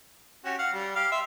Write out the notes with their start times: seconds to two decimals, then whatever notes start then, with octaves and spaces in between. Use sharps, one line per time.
0.45 C#4 F#4 G4
0.59 F5 F#5
0.73 G3
0.96 G4 F5
1.12 E5 C6